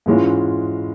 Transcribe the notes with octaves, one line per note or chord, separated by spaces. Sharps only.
G#2 E3 G#3 C#4 F4